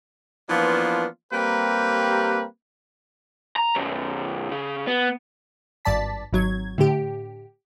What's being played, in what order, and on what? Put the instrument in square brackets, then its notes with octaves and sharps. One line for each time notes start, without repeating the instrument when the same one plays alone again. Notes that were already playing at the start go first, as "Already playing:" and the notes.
[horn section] E3 F3 A#3 B3 D4 F4
G3 A#3 C4 G4 A#4 B4
[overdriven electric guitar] A#5
B1 F#2
C#3
B3
[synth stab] G#1 G2 D5 A5 B6
G#1 F#3 G#6
A2 D3 G4